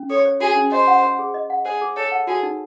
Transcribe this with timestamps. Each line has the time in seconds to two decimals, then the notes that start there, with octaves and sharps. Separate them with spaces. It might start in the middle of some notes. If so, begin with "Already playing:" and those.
Already playing: C#4
0.10 A4 C#5
0.25 C5
0.40 F#4 G#4
0.56 C#4
0.72 C5 D#5
0.87 F#5
1.03 C5
1.19 G#4
1.34 D#5
1.50 F#5
1.65 G#4 C5
1.81 G#4
1.96 A4 C#5
2.12 F#5
2.27 F#4 G#4
2.43 D#4